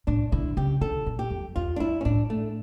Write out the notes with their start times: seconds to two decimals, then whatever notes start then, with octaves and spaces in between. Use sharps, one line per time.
0.07 A2 D4
0.32 D3 E4
0.57 C#3 G4
0.81 D3 A4
1.06 A#2
1.19 G4
1.30 F2
1.56 E2 F4
1.76 D4
1.80 F2 E4
2.01 C#4
2.05 A2 D4
2.30 A3